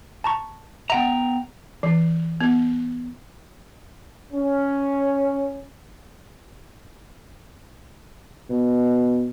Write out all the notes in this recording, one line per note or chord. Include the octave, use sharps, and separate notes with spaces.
A5 A#5 C#6
B3 E5 F#5 G5 A#5
E3
B3
C#4
B2